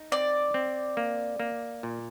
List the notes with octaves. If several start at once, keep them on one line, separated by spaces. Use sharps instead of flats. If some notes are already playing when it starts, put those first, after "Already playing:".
Already playing: D#4
C4 D5
C4
A#3
A#3
A#2